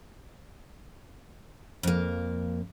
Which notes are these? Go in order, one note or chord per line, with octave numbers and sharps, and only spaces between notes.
F2 A#3